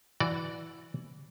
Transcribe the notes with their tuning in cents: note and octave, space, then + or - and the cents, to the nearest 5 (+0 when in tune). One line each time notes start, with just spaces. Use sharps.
E3 +0 F#4 -10 D5 +0